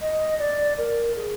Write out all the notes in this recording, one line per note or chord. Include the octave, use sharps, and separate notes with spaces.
D#5
D5
A#4
G#4